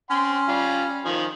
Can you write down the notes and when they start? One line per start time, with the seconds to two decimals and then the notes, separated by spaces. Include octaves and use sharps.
0.10 C#4 G5 C6
0.48 G3 F4
1.05 D#3 F3 G#5